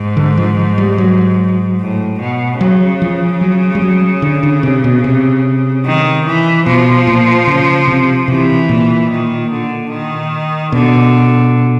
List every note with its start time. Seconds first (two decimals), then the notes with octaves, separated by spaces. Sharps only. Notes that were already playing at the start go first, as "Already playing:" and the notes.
Already playing: G#2
0.17 D3
0.37 F3
0.78 G3
0.98 F#3
1.79 A2
2.20 B2
2.60 C#3 F#3
3.02 F3
3.41 F#3
3.75 G3
3.82 F#3
4.22 D3
4.43 D3
4.63 C3
4.84 B2
5.04 C3
5.85 D#3
6.26 E3
6.66 B2 F3
7.07 A#2
7.47 C#3
7.87 C3
8.28 C3 E3
8.69 A#2
9.09 D#3
9.50 D3
9.91 D#3
10.72 B2 D3